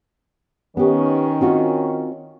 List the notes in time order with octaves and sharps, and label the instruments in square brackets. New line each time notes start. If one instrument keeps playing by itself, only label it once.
[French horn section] D#3 C#4 [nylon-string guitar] B3 G4
[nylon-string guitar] C4 F4 F#4